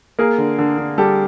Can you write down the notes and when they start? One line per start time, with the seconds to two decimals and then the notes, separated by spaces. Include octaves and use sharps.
0.19 A#3 G#4 A#4
0.38 D3
0.58 D3
0.78 D3
0.98 G3 G4 A4